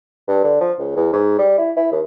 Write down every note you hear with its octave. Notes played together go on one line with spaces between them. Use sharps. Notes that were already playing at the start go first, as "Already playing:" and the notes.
G2
D3
F3
C#2
E2
G#2
G3
E4
E4
D#2